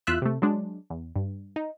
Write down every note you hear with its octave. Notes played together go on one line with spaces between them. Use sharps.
E2 F4 E5 E6 F#6
C3 A3
F#3 G#3 D4
E2
G2
D#4